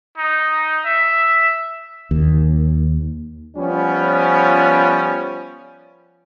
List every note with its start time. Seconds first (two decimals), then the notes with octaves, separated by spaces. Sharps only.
0.18 D#4
0.85 E5
2.11 D#2
3.56 F3 G3 B3 C#4